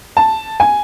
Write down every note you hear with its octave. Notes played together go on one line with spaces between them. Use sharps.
A5
G#5